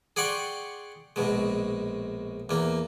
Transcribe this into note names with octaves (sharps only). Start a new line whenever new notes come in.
G#4 D5 F#5 G5 C6 C#6
A#1 B2 G#3
E2 A#3